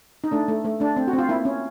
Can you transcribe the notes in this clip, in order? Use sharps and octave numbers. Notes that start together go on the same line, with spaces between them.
D#4
A3 D4
A3
A3
A3 D4
C4
F#4
C4
F4
A#3 E4
C#4